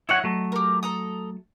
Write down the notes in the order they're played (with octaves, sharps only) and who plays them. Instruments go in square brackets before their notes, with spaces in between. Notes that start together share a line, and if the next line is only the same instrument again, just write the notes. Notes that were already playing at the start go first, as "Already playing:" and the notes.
[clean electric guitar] E4 C#5 F#5 [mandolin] D#5
[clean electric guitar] F#3 A3
[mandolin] G4 A#4
A4 A#5 D#6